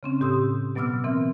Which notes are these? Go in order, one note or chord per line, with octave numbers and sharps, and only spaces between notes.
C#3 C4 C#4
A2 G4 C6 D#6 E6
B2 F#3 B3 D6 E6 F6
E3 C4 A#4